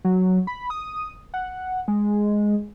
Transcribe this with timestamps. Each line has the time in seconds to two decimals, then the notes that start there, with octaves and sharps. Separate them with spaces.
0.05 F#3
0.47 B5
0.70 D#6
1.34 F#5
1.88 G#3